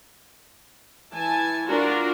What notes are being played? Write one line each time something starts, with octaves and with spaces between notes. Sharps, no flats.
E3 G#5 A5
D4 F4 F#4 A#4